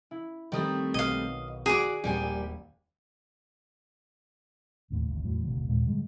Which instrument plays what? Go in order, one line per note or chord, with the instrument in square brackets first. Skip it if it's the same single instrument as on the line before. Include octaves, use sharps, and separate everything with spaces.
[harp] E4
[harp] D#3 A#4 D#6 [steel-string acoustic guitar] G3 A3 C4
[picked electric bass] B1 [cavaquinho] D#5 F5
[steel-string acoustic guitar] F#4 D5 [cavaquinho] G#4 D6
[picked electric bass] D#1 [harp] A#1 [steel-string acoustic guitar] G3 A#3 G#5
[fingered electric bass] G#1 D#2 A2
G#1 D2
E2 A2 F#3
F#1 D2 B2
F1 D#2 A#2 G#3
G#2 D3 G3 G#3